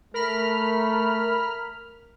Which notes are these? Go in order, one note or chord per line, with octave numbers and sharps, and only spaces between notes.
A3 A#4 B5 F6